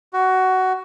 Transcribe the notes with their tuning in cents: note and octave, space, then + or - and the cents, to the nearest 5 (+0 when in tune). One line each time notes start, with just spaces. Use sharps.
F#4 +15